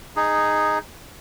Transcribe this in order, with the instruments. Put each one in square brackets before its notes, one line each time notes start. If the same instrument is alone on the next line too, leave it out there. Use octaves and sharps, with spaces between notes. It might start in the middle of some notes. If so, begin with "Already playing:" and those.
[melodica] D#4 G#4